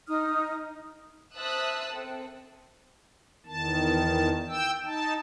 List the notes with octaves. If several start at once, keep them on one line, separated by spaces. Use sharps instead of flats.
D#4 D#6 F6
C5 E5 A5 D#6 E6 F#6
C4 A4
E2 D#3 A5
G5 E6
D#4 A5